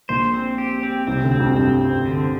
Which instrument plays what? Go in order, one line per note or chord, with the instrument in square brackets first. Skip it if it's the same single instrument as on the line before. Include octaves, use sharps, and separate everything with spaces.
[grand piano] A#1 A#2 [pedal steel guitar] C5
[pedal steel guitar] C4
G4
C4
[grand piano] C2 C3 [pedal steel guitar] C4
[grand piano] D2 D3
[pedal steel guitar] C4
[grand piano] F2 F3
[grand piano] G2 G3 [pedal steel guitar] C4
[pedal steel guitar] C4
D3